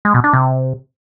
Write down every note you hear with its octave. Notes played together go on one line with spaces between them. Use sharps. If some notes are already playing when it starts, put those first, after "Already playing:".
G#3
B2
D4
C3